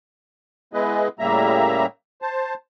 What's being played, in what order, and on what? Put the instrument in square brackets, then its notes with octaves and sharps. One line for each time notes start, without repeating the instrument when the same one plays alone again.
[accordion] G#3 B3 E4 G#4 B4 D#5
A2 C#3 G3 A#3 E5 A#5
C5 A5